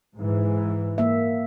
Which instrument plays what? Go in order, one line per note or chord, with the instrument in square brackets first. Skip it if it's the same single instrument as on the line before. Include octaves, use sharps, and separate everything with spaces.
[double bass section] G#2 E3
[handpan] A#3 E5